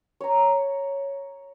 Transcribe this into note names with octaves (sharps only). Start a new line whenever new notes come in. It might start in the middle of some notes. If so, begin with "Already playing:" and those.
C#5 A#5